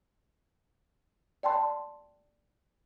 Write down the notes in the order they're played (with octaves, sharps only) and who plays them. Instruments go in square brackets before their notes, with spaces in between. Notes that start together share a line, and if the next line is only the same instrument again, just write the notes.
[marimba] D5 G5 A5 C6